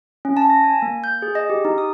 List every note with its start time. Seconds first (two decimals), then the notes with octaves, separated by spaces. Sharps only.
0.25 C#4
0.37 A5
0.50 A#6
0.64 G#5
0.82 A#3
1.04 G6
1.22 G#4
1.35 D#5
1.50 G4
1.65 D#4
1.78 D#6